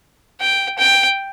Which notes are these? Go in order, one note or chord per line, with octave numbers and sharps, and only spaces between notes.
G5
G5